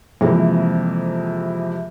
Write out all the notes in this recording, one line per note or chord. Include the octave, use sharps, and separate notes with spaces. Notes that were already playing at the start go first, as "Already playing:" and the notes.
F2 C3 E3 G#3 A#3